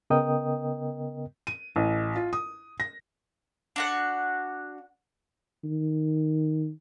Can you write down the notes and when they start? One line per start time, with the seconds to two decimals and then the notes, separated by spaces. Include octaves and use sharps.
0.10 C#3 B3 A#4 D#5 G5 D#6
1.47 D#7
1.76 A1
2.15 F4
2.33 D#6
2.80 A#6
3.76 D4 F#4 F#5
5.64 D#3